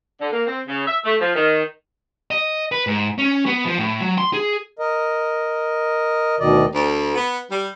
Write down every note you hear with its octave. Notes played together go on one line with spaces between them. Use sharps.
D3
A#3
C4
C#3
E5
A3
F3
D#3
D#5
B4
G#2
C#4
B3
F3
A2
F#3
C6
G#4
A#4 D#5
D2 B2 D#3 D5 D#5
D2
B3
G3